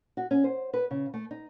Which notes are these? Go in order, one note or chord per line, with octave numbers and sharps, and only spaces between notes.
F#4
C#4
C5
B4
C#3
A3
D#4